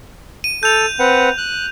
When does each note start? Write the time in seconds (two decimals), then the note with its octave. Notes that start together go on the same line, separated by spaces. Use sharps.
0.44 D#7
0.63 A4 G6 F7
0.99 C4 B4 F#5
1.38 F#6